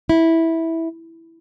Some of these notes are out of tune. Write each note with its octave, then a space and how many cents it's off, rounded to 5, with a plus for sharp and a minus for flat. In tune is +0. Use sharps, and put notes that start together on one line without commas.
E4 -10